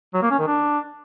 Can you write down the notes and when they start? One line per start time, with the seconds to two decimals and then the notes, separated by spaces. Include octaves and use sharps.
0.14 F#3
0.22 A#3
0.31 C#4
0.39 D#3
0.47 D4